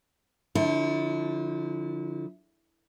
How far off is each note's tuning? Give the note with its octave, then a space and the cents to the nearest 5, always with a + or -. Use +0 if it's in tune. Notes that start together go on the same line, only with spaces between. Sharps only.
D3 -10 F3 +0 E4 -35